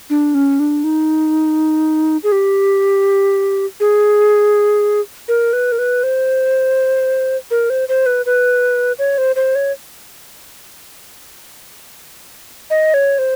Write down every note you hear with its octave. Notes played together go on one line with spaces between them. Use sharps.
D4
C#4
D4
D#4
G#4
G4
G#4
A#4
B4
A#4
B4
C5
A#4
C5
C5
B4
B4
C#5
C5
C5
C#5
D#5
C#5
C5